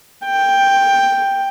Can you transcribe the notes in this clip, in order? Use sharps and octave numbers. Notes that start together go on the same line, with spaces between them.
G5